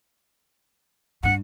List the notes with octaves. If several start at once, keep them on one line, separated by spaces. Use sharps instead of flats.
G2 D4 F#5